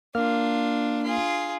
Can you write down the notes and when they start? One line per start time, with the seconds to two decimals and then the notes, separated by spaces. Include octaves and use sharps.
0.15 A#3 D4 F4 F6
1.03 F4 G#4